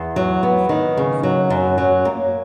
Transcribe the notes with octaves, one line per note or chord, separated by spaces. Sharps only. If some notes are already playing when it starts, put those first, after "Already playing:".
Already playing: E2
F#3
B3
D#3
C#3
F#3
F#2
F#3
A#3